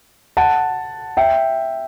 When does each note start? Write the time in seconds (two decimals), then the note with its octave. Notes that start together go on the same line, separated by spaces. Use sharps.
0.37 F#5 A5
1.17 E5 G5